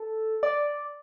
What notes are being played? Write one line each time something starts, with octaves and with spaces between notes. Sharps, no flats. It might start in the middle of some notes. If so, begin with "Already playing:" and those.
Already playing: A4
D5